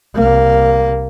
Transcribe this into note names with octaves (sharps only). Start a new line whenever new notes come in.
C2 A#3